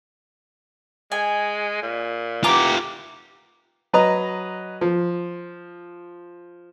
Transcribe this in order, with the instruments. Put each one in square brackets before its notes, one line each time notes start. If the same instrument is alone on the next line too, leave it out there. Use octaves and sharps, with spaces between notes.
[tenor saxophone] G#3 [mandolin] G#5
[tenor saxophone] A#2
[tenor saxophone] E3 [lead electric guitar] F4 G4 [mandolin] A#5 D6
[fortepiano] F#3 B4 D#5 A#5
F3